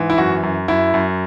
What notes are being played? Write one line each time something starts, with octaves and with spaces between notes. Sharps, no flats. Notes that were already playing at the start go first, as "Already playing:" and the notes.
Already playing: G#2 E3
E4
F#2 F#4
F#2
F#2 E4
F#2